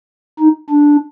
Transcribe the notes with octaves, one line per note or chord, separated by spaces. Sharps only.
D#4
D4